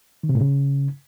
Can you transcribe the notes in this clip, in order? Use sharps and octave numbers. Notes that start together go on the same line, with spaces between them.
D#3
C3
A2
C#3